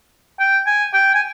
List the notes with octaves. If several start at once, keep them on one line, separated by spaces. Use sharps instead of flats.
G5
G#5
G5
G#5